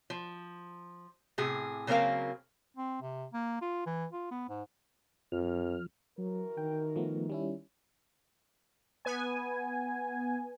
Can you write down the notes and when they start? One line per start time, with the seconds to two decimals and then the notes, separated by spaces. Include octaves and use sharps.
0.10 F3
1.38 A2 C3 G#4
1.87 C#3 F#3 A#3 C4 A#4 F5
2.77 C4
3.02 C3
3.33 A#3
3.62 F4
3.86 E3
4.13 F4
4.31 B3
4.49 G#2
5.32 F2 F3 F6
6.18 E3 F#3 F#4 A#4
6.57 D#3 G5
6.96 F3 A3 B3
7.30 G3 C#4 E4
9.05 B3 G#5